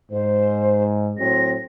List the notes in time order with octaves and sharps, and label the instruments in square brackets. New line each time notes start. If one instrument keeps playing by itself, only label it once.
[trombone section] G#2 [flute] C5
[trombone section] A2 F#3 C4 [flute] A#6